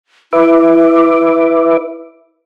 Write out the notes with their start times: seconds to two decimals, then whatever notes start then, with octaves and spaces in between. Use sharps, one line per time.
0.33 E4 B4 E5 D6